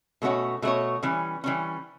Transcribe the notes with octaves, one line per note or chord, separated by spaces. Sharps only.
B2 A3 C#4 F#4 C#5
B2 A3 C#4 F#4 C#5
E3 G3 C#4
E3 G3 C#4